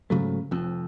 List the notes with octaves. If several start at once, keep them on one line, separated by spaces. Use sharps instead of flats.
G#2 C#3 F#3 A3
F1 F2